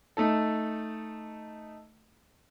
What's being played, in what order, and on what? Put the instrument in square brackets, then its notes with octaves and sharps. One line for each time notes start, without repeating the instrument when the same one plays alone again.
[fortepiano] A3 D#4 A4